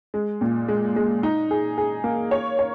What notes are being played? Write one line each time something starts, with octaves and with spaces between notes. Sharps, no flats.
G#3
A#2
G#3
G#3
D#4
G#4
G#4
A#3
C#5
C#5